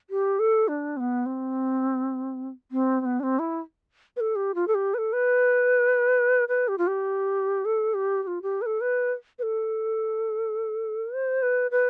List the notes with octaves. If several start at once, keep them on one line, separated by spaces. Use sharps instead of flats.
G4
A4
D4
C4
B3
C4
C4
C4
B3
D4
C4
E4
B4
A4
G4
F4
A4
G4
B4
A4
B4
B4
G4
F4
G4
A4
G4
G4
F4
G4
B4
A4
B4
B4
A4
C5
B4
B4